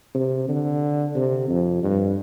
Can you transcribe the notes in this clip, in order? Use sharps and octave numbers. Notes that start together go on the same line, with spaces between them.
C3
D3
C3
F2
G2